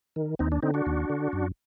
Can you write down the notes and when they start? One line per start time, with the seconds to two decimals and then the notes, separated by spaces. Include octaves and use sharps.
0.16 D#3
0.39 D#2 C4 D#4
0.52 D4
0.62 D3 C4 D#4
0.74 D4 F#4
0.86 D#2
1.10 D3
1.33 F#2